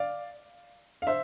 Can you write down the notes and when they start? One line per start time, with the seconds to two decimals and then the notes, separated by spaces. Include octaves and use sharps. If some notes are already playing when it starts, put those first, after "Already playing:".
Already playing: D5 F5
1.02 F5
1.07 C5 E5